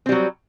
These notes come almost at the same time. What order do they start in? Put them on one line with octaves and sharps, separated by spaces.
C4 G3 F#3